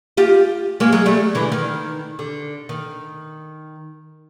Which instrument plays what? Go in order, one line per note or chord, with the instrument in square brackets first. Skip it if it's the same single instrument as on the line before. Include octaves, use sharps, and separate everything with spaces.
[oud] F4 G4
G#3 A#3
F#3 G#3
G3 A3
D3 E3
D#3
D3
D#3